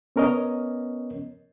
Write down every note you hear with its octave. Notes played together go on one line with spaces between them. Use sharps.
B3 C#4 A#4 C#5 D#5